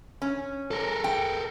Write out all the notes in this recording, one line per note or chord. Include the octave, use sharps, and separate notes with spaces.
C#4
A4 A#4
G5